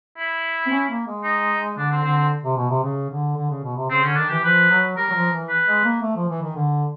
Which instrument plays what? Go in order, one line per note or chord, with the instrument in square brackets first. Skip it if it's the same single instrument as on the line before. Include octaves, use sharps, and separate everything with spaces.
[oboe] E4
[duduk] C4
C#4
A#3
G#3
[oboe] D#4
[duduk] D3 [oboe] D4
[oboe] C4
[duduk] D3 [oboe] C4
[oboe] C4
[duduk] C3
B2
C3
C#3
D3
D3
C#3
B2
C3
[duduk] C#3 [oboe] C4
[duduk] D3 [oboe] C#4
[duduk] D#3 [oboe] D4
[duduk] E3 [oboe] G4
[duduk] F3 [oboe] B4
[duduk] F#3
[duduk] G3 [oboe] A#4
[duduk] F#3
F3
E3
[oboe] B4
[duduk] G#3
A#3
A3
F3
E3
D#3
D3